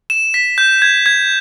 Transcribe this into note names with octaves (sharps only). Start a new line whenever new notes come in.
E7
B6
G6
G#6
G#6